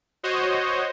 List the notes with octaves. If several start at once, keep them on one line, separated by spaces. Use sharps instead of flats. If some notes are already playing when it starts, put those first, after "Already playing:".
F#4 C5 C#5 D#5